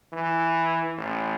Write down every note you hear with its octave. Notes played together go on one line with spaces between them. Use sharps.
E3
A1